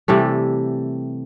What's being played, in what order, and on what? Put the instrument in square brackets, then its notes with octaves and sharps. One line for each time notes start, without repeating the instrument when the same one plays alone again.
[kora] C3 E3 G3 A3